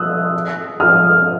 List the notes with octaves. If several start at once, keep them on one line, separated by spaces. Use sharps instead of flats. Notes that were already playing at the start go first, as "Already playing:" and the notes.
Already playing: D#6 E6 F#6
D#6 F6